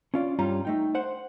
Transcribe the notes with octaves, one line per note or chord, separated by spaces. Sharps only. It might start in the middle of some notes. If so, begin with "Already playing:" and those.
C#4 F4 D5
G2 G3 C#4 F4 A#5
A3 D#4 G5
C5 F#5